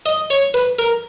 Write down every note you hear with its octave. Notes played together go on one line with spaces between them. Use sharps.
D#5
C#5
B4
A#4